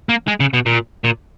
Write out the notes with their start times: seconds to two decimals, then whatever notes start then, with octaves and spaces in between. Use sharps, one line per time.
0.09 A#3
0.28 G#3
0.40 C#3
0.53 B2
0.66 A#2
1.04 A#2